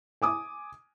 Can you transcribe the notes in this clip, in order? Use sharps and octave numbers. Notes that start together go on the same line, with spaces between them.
G#5 D6 D#6